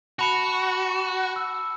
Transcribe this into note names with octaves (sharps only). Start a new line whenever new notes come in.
F#4 A5 B5 C#7
E6